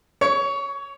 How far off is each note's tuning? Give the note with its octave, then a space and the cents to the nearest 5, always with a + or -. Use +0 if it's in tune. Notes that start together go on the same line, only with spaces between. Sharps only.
C#5 +0 C#6 +25